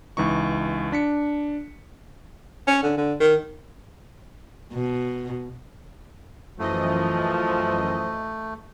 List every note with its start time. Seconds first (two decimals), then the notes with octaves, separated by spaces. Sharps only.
0.17 C#2 E3 D#4 C#6
0.92 D4 B6 C#7
2.67 C#4
2.83 D3
2.97 D3
3.20 D#3
4.73 B2
6.59 F#2 E3 F3 A3 D#5